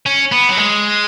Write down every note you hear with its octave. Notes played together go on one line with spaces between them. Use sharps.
C#4
B3
F#3
G#3